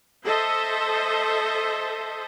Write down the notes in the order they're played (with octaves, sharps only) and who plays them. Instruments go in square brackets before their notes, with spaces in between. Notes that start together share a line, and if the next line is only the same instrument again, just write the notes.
[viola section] A4 C5 D#5 E5